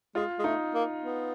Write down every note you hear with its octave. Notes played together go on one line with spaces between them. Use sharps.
G#3 F4
G#3
A3 D#4
A#3
B3